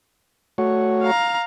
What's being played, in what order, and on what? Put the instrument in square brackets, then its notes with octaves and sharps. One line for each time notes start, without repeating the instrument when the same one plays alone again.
[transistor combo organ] A3 F#4 C#5
[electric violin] F5 A#5